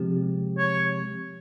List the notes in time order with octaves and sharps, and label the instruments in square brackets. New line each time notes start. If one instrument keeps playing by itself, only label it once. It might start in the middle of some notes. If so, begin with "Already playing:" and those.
Already playing: [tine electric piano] C3 F3 G#3 C4 G4
[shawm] C#5